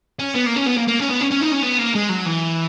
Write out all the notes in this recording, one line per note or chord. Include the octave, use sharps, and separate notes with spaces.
C#4
B3
A#3
C#4
B3
A#3
A#3
C#4
B3
C#4
C#4
D#4
C#4
B3
A#3
G#3
F#3
E3